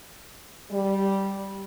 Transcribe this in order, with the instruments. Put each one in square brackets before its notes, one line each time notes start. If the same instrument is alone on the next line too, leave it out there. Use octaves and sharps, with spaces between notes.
[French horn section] G3